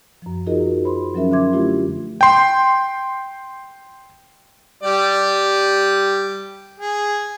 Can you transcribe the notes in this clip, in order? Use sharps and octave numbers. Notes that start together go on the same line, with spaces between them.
F#2 F3
D#4 F4 F#4 G#4 A#4 D#5
C5 B5 C6
F3 F#3 C#4 A#4 E5
D3 E5 C6 D6 G#6
A3 D4 E4 F4 G4
G5 C6
G3 G4 D5
G#4